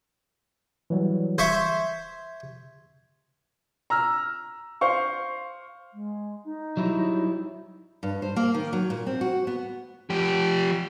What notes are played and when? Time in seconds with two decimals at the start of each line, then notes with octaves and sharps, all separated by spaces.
0.90 E3 F#3 G3
1.38 C5 E5 C#6 G#6
3.90 A#5 E6 F6
4.81 C5 F5 C#6
5.94 G#3
6.45 D#4
6.77 F#3 G3 E4
8.03 G2
8.22 C5
8.36 A#3
8.54 D#3
8.73 F#3
8.90 A#2
9.07 C4
9.21 F#4
9.47 B3
10.10 F3 G4